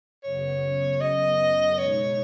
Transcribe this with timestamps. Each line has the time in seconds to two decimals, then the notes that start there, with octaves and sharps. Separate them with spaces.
0.23 F#2 C#3 F#3 B3 C#5
1.00 D#5
1.77 B2 G#3 D#4 C#5